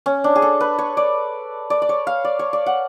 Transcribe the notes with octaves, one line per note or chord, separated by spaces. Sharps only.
C#4
D4
G#4
A4
B4
C#5
D5
D5
D5
C#5
F5
D5
C#5
D5
F#5